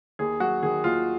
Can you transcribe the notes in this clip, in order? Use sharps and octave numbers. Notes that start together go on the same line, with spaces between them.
D#2 G#4
F#3 F#4
D#3 G#4
D#2 F4